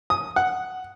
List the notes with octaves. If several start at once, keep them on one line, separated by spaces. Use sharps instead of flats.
D#6
F#5